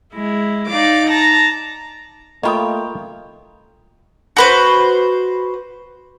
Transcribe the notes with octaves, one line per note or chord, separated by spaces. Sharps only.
G#3 E4
D#4 D5 F5 D6
A5 A#5 A#6
A3 A#3 F4 C#5 D#5 G5 B5 D#6
F#4 B4 C5